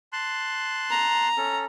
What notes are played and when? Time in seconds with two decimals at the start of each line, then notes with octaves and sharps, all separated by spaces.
0.13 A5 C6 F#6
0.90 A#5
1.37 C#4 A4